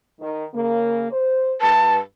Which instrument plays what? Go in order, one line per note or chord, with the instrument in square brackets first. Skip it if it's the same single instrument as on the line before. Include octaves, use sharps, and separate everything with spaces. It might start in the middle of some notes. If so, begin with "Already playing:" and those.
[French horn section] D#3
C#3 A#3
C5
[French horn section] G2 B4 [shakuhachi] A5